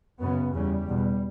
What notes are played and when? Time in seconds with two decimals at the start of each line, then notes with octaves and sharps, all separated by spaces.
0.20 F#2 C#3 B3
0.54 E2 C#3 G3
0.88 E2 B2